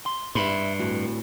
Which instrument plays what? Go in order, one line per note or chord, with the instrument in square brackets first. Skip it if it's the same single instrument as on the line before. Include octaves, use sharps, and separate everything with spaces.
[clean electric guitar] C6
[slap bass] G2 [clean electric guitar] E5 B5 C6
[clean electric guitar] A2 F#4